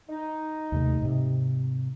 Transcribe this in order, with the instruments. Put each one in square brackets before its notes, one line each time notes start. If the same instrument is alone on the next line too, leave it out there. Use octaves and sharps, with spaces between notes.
[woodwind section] D#4
[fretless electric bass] D#2 C3 A3
G#2 C3